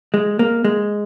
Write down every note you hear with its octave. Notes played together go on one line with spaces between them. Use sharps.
G#3
A#3
G#3